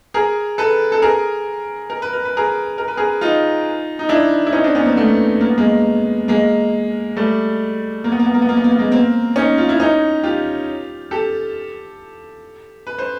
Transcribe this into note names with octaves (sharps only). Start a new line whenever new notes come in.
G#4 A#4
A4 B4
A4
G#4 A#4
A#4
B4
A#4
B4
G#4 A#4
A#4
B4
G#4 A#4
D#4 F4
D#4
D4 E4
E4
C#4 D#4
C4 D4
B3 C#4
A#3 C4
A3 B3
A#3
B3
G#3 A#3
G#3 A#3
G3 A3
A#3
B3
A#3
B3
A#3
B3
A#3
B3
A#3
B3
G#3 A#3
A#3 C4
C#4 D#4
F4
E4
C#4 D#4
F4 G4
G4 A4
B4
C5